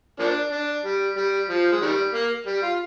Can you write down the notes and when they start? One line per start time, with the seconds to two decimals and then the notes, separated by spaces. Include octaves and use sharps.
0.19 F3 A#3 D4
0.52 D4
0.84 G3
1.17 G3
1.49 F3
1.72 G#3
1.82 D#3 G3
2.14 A#3
2.47 G3
2.63 F4